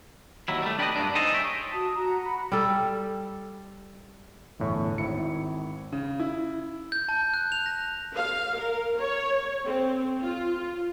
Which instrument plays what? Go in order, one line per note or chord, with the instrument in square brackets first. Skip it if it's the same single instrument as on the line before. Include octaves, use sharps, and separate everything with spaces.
[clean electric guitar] D#2 D#3 F#3 E4
G3 A3
D4 E4 G4 A#4 B4 D#5
G2 A#2 A3 B3 D4
D#4 G#4 A4 C5 D#5
C#5 E5 G5
[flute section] F#4 A5 D#6
F#4 A#5
F#4 B5
[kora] G3 A4
[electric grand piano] G1 E2 A2 C#5 C#6
G#1 E4 C#7
[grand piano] C#3
E4
[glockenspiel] G6
A5
F#6
F7
A#6
[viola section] F5
A#4
C#5
C4
F4